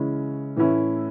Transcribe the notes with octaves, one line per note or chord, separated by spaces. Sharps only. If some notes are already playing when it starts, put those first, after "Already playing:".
Already playing: C#3 E3 G#3 C#4 E4
A2 E3 A3 C#4 E4